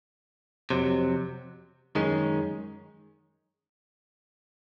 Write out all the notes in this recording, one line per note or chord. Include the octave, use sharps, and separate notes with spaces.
F2 C3 F#3
F#2 D#3 G#3 C#4